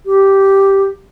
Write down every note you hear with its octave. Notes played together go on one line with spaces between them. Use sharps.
G4